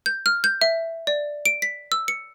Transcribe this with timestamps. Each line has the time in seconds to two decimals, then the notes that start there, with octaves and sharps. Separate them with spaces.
0.06 G6
0.26 F6
0.44 G6
0.61 E5
1.07 D5
1.46 D7
1.62 B6
1.92 E6
2.08 C#7